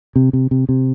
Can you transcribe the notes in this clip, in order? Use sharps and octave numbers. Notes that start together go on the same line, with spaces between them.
C3
C3
C3
C3